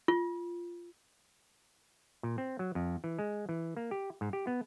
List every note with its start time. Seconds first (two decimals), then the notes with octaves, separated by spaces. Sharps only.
0.08 F4
2.23 A#2
2.38 C4
2.59 F#3
2.75 F2
3.04 E3
3.19 G#3
3.49 E3
3.77 A#3
3.91 G4
4.21 G#2
4.33 G4
4.47 B3